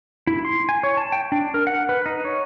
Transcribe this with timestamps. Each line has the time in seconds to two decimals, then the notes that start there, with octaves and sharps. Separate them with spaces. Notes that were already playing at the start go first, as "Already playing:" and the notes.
0.27 E4
0.45 C6
0.69 G#5
0.83 C#5
0.97 A5
1.12 G5
1.32 D4
1.54 A#4
1.67 F#5
1.89 B4
2.06 D#4
2.25 C#5